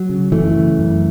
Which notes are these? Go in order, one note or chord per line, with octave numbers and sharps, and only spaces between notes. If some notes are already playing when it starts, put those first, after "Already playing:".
Already playing: F#3
C#3
F#2 E3 A3
C#3
F#2